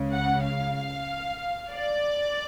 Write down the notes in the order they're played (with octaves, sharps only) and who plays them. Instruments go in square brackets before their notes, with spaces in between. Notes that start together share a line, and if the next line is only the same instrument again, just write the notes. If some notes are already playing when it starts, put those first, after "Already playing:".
Already playing: [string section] C#2 C#3
F#5
F5
D5